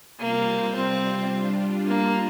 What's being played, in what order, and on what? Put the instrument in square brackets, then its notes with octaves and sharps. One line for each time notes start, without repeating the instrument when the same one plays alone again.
[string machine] C3 G3 C4 F4 C5 [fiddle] A#3
[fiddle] C4
[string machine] G3 D4 F4
[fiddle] A#3